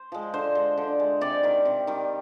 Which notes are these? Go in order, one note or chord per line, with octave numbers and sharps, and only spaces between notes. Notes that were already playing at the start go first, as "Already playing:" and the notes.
Already playing: C5
F3 G#3
D3 C5
G#3
D3
G#3
C3 D5
D#3 G3
C3
D#3 G3